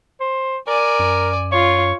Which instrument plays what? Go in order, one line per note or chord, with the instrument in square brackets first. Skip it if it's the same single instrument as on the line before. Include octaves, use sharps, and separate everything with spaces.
[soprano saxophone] C5
[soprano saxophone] A#4 [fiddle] D5 G#5
[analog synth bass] F#2
[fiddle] F4 [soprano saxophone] C#5